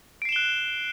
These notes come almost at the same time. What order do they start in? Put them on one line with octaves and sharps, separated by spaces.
D7 C7 E7 G7 F#6